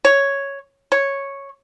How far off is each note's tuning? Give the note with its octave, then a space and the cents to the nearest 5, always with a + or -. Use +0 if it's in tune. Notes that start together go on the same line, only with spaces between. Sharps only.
C#5 +0
C#5 -5